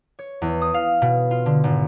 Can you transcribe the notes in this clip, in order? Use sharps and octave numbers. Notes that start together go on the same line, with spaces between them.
C#5
E2
D#6
F5
B2
F4
D3
G#1